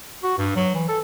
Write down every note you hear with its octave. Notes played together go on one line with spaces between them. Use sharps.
F#4
G2
F#3
E3
A4